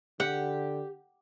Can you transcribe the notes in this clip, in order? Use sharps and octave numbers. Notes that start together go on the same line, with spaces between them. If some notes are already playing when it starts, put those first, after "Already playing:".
D3 G4 F#5